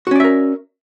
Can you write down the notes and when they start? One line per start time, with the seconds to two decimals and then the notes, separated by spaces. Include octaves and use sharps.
0.07 F#4
0.11 C#4
0.16 D5
0.20 E5
0.24 A#4